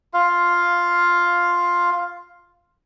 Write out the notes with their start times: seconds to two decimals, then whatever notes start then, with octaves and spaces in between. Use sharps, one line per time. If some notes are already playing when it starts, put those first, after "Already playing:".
0.14 F4 F5